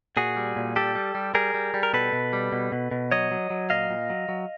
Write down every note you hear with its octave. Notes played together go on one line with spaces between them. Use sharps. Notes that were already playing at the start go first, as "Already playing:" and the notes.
A#2 F#4 G#4
G3
A#2
G3 G4 A4
G3
G3
G3 G#4 A#4
G3
G3
A#4
B2 A4 B4
B2
G3
B2
B2
B2
F#3 C#5 D#5
F#3
F#3
A#2 D#5 F5
A#2
F#3
F#3